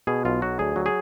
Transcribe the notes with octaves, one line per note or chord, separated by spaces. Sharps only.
B2 G#4
B1 F4
F#3 F#4
D2 G#4
F#3
G#4